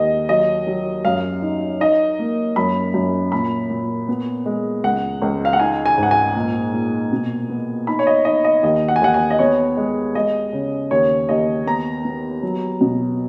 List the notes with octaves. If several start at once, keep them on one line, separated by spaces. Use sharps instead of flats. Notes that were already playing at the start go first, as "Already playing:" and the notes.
Already playing: D#2 G#3 A#3 D#5
F#3 D#5
F#3
F#2 F5
D#4
D#4 D#5
A#3
F#2 B5
F#2
A#2 B5
A#2
B3
G#3
C#2 F#5
C#2
F5
F#5
D#4 G#5
G#5
G#2
F#5
G#5
A#2
A#2
B2
B3
D#4 B5
C#5
D#5
D#4 D#5
D#5
D#2 D#5
F#5
G#5
D#2 F#5
G#5
D#5
B3 C#5
G#3
G#3 D#5
C#3
D#2 C#5
D#2 D#5
B3 A#5
B3
F#3
B2